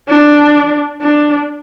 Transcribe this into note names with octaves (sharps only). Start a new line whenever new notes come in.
D4
D4